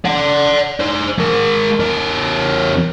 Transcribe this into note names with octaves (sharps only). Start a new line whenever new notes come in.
D5 F#5
G#4 C5
G#3 A#4
E2 A#4